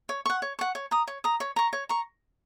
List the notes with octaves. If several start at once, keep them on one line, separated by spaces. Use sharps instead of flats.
C#5
F#5 C#6
C#5
F#5 C#6
C#5
A#5 D#6
C#5
A#5 D#6
C#5
A#5 C#6
C#5
A#5 C#6